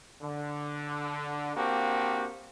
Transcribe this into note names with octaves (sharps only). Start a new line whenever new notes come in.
D3
A#3 C4 D4 F#4 G4